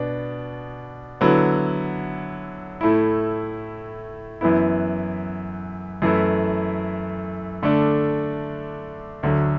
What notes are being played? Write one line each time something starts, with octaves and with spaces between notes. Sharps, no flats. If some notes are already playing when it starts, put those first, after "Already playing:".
Already playing: B2 B3 D4
D3 F#3 B3 E4
A2 A3 E4
F#2 E3 B3 E4
F#2 E3 A3 E4
D3 A3 D4
D2 D3 F#3